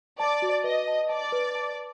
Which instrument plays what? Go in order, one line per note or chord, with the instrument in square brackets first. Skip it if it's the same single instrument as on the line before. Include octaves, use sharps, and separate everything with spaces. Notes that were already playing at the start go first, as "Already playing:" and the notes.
[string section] D5 [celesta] A5
[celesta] F#4
[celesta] B4 [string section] D#5
[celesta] A5
[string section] D5 [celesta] A5
[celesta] B4
A5